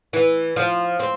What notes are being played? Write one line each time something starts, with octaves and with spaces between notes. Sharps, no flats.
E3
F3
C4